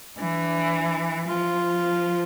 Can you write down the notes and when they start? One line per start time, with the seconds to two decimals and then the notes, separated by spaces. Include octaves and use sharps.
0.18 E3 D4
1.28 F3 F4